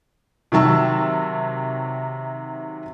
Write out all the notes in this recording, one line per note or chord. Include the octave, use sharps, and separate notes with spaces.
C3 D#3 F#3 A5 E6